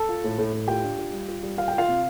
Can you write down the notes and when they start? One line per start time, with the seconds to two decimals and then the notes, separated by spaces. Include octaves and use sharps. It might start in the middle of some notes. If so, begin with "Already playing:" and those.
Already playing: A4 A5
0.09 F4
0.24 A2
0.38 A2
0.53 A2
0.68 F4 G4 G5
0.84 D4
0.98 F4
1.13 G3
1.28 F4
1.43 G3
1.57 F4 F5
1.68 F4 G5
1.78 F4 F5
1.88 C3